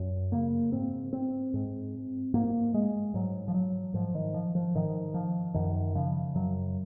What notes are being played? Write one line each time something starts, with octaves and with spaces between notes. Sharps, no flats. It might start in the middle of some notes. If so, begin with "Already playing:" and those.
Already playing: F#2
C#3 A#3
G#2 C4
C4
G#2
G#2 A#3
G#3
G#2 F#3
F3
F#3
G#2 F3
D#3
F3
F3
G#2 D#3
F3
F#2 D#3
C#3 F3
F#2 F#3